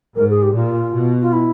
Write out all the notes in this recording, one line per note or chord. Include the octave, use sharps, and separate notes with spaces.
G#2 A#4
G#4
G4
A#2 F4
B2
F4
E4